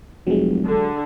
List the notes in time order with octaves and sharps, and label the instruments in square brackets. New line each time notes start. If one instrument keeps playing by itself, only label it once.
[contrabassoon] F1 [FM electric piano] F#3 G#3
[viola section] D3